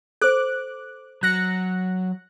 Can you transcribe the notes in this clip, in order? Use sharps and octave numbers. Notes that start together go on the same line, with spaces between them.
A4 C5 D6 F#6
F#3 F#6 A#6 C#7